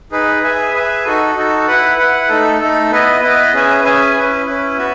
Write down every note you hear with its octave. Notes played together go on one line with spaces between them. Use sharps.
D#4 G#4 B4
G#4 B4 E5 G#5
G#4 B4 E5 G#5
D#4 F#4 A4
D#4 F#4 A4
E4 B4 F#5
E4 B4 F#5
A3 D#4 A4
A3 D#4 A4
B3 E4 B4 D#5
B3 E4 B4 D#5
C#4 G#4 B4 E5 G#5
C#4 G#4 B4 E5 G#5
C#4 E4 B4
C#4 E4 B4
B3 F#4 B4 E5